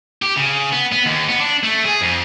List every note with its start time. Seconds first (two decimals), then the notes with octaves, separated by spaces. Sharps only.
0.22 G4
0.36 C#3
0.72 B3
0.92 B3
1.06 D#2
1.29 B3
1.41 D4
1.63 A3
1.85 G#4
2.01 F2